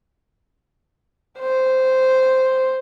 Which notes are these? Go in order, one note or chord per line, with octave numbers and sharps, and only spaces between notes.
C5